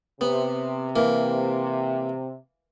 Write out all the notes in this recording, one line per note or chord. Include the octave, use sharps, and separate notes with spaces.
C3 B3
E3 A#3